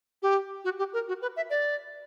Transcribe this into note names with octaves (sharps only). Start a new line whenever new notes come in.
G4
F#4
G4
A#4
F#4
B4
E5
D5